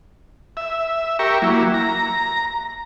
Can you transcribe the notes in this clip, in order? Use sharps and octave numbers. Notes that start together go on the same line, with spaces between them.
E5
G4 A#4 E5 C#6
F#3 A#3 E4
A#5